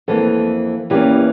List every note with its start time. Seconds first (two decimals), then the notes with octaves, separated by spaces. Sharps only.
0.08 F2 E3 G3 A#3 A4
0.90 E2 E3 A#3 C#4 G4